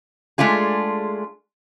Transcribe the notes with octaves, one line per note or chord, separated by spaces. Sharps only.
G#3 A3 D4 F4 G#4